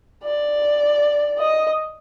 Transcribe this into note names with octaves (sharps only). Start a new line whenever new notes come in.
D5
D#5